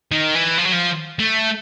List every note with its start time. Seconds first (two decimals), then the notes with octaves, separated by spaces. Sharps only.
0.12 D#3
0.35 E3
0.58 F3
0.65 F#3
0.73 F3
1.19 A3